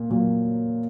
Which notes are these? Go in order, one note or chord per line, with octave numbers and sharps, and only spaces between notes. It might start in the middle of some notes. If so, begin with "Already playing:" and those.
Already playing: A#2
A#2 F#3